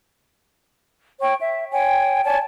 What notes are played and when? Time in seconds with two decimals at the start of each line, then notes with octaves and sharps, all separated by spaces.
1.21 C#5 G5 C#6
1.41 E5
1.73 C#5 G5 G#5
2.24 C#5 D5 G#5 A5